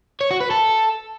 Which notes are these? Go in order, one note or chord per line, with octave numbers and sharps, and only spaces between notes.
C#5
F#4
B4
A4